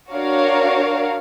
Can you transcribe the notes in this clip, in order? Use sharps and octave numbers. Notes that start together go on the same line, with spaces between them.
D4 F#4 A#4 C#5 F5